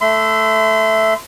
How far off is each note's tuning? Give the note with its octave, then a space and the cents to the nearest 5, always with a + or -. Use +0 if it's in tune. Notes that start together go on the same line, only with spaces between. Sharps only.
A3 +0 E5 +0 C6 -35